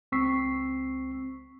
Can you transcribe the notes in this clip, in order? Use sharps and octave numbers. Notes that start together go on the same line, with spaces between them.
C#2 C4 C#6 E6 B6 C7